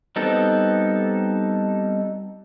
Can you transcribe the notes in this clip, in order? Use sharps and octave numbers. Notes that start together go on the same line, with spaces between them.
G3 B3 C4 D#4 A4